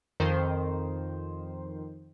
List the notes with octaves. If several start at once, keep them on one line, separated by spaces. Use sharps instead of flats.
F2 D#3 C5